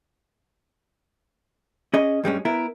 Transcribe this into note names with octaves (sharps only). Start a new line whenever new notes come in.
C#4 G#4 D#5
G2 G3 G#3 C#4
B3 E4 A#4